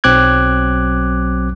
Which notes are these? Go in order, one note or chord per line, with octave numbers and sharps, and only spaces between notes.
B1 F#3 C4 D6 F#6 G#6